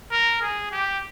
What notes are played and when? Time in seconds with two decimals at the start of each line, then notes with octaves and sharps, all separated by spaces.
0.11 A#4
0.42 G#4
0.71 G4